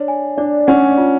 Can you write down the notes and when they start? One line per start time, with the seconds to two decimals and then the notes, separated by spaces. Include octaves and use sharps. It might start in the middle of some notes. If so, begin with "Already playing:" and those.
Already playing: D4 C#5
0.08 G#5
0.38 D4 D5
0.67 C#4 F#5
0.98 F4